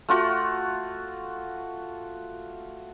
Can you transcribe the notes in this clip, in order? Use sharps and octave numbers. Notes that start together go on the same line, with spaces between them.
A3 F4 F#4